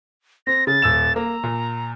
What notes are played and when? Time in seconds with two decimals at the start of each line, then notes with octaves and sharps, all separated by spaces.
0.47 C4 A#6
0.67 C#3 A6
0.82 D#1 E6 E7
1.16 A#3 A#5
1.43 A#2